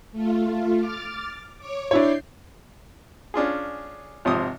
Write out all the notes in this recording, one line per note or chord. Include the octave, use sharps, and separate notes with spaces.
A3 F4
D6 F6 A6
C#5 D6
D4 E4 C#5 G6 C7
C#4 D4 F4 G#4
G#1 C3 F3 C6 D#6